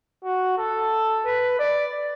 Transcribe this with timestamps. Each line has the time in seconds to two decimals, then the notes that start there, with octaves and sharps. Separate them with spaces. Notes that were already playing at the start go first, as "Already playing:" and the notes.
0.25 F#4
0.58 A4
1.25 B4
1.59 D5